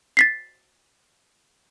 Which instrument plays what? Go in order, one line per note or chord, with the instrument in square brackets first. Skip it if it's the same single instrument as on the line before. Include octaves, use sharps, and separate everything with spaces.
[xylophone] A6 B6 C7